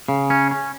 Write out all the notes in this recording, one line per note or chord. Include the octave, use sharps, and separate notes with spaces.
C#3
C#4
C#4